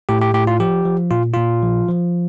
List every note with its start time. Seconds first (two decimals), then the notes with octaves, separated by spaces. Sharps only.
0.09 A2 G4
0.22 G4
0.34 A2 G4
0.47 F4
0.60 F3 G4
0.85 F3
1.11 A#2 F4
1.34 A#2 F4
1.62 F3
1.89 F3